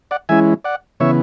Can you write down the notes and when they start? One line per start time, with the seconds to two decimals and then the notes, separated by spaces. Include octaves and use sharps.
0.11 D5 F#5
0.29 E3 G#3 C#4 E4 E5 G#5
0.64 D5 F#5
1.00 C#3 E3 B3 C#5 E5